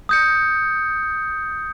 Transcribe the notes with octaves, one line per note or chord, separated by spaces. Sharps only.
D#6 G6 C#7